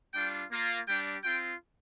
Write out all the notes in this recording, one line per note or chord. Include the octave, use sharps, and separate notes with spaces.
G3 D4 F4 G5
A#3 F4
G3 D4 G4 G5
C4 F4 G5